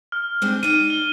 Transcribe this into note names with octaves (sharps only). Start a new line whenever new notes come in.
F6
G#3 C4 D4
D#4 D5 D#7
G7